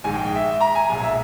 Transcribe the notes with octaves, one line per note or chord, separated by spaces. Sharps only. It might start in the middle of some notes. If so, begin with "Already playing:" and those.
A#1 G#2 D#3 G#3 G#5
G5
G5
E5
E5
A#5
G#5
B1 A#2 G#3 G#5
E5